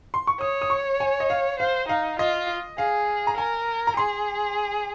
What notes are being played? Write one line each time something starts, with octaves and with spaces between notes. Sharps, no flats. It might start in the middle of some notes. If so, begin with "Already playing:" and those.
C6
C#6
C#5 D#6
D#6
C#6
G#5
D#5
F5
C5 F5
D#4 F5
F4 D#5
G#4 F5
A#5
A#4 G#5
A#5
G#4 C6